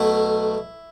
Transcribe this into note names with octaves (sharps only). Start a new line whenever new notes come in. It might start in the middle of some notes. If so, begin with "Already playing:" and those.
Already playing: B1 B2 A3 E4